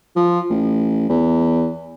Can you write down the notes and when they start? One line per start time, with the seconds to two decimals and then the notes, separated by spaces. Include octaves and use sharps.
0.16 F3
0.50 A1
1.09 E2